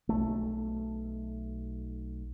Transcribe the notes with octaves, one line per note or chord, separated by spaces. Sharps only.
B1 A3